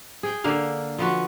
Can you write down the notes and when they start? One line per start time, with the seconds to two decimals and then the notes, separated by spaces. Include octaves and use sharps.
0.23 G#4 G5
0.44 D3 A#3 F5
0.98 F3 B3 F#4